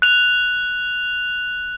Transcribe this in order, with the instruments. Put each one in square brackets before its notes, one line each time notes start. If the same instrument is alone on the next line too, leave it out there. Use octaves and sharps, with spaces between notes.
[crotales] F#6 F7